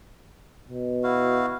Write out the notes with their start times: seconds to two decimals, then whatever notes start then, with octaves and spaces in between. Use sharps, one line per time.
0.68 B2
1.04 E4 F#4 F5